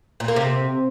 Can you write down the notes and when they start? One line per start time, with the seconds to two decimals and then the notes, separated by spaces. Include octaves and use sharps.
0.20 A#2
0.28 A#3
0.36 C3